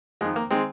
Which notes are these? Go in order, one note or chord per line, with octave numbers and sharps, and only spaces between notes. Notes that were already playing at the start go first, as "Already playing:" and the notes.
F2 D#3 G#3
A#3
D#3 G#3 C4